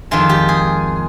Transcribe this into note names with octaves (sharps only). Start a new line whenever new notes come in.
F2 D#3 G#3 F4
G4
G#4